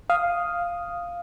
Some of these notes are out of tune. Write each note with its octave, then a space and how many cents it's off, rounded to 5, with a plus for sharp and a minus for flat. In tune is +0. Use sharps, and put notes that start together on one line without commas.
F5 +0 D#6 +0